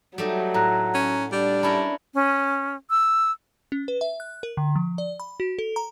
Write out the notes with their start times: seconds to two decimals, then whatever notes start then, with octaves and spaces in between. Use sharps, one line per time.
0.18 F#3 G3 A3 D#4
0.54 A2 A#5 F#6 A#6
0.94 C#4
1.32 G3 D4
1.63 C#4 E4 A#4 A5 B5
2.14 C#4
2.90 E6
3.72 C#4
3.88 B4
4.01 E5
4.20 F#6
4.43 A#4
4.57 D3
4.76 F3
4.98 D5
5.20 B5
5.40 F#4
5.59 A4
5.76 A#5